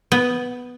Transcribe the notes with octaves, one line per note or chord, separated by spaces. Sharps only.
B3